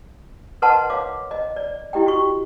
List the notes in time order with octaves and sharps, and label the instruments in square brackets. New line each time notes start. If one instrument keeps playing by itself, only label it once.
[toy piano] A#4 B4 D#5 F#5 A5 C6
C#5 F5 D6
D#5
D5
E4 G4 D#5 G5
F#4 C#6